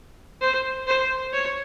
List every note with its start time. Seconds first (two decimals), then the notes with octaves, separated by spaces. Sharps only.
0.41 C5
0.87 C5
1.33 C#5